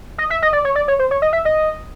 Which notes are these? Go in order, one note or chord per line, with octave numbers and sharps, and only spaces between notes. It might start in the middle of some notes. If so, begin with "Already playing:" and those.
D#5
E5
D#5
D5
C#5
D5
C#5
C5
C#5
D#5
E5
D#5